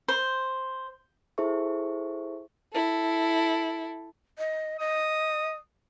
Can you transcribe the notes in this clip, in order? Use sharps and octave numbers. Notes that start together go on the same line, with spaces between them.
C5
E4 G#4 A4 C5 E5 C#6
E4 A4
D#5
D#5 D#6